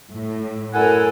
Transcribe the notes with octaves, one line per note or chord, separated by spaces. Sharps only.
A2
F#2 E4 A4 A#4 F#5 G#5